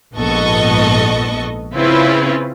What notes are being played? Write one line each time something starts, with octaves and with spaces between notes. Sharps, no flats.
A#1 G#2 B3 A4 D#5 C#6
C#3 C4 C#4 E4 F4 B4